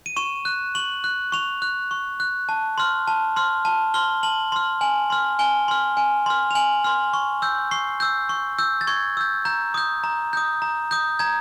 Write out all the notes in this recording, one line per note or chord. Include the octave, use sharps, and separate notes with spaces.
D#7
C#6 E7
F#6
C#6 F#7
F#6
C#6 F7
F#6
C#6
F#6
A5
C6 F6
A5
C6 F6
A5
C6 F6 G7
A5 F#7
C6 F6
G#5 F#7
C6 F6
G#5 G7
C6 F6
G#5
C6 F6
F7
G#5 F#7
C6 F6
C#6
E6 G6
C#6 C7
E6 G6
C#6
E6 G6
A6
C#6 G#6
E6 G6
A#5 G6
D#6 G6
A#5
D#6 G6
A#5
D#6 G6
A#5 G#6